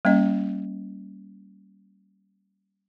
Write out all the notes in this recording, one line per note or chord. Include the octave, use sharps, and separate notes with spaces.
G3 A#3 C#4 D#5